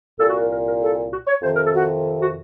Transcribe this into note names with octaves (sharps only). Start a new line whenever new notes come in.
C2 A#2 A4
F#4
A#4
A#4
A#4
A4
F#4
C#5
F2 C3 D#3 C5
A#4
A4
F#4
F#4